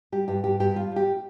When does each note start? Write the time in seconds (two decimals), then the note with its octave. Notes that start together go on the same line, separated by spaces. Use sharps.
0.12 G3 G4
0.28 G2 G4
0.44 G2 G4
0.60 G2 G4
0.76 G3 F4
0.91 G3 G4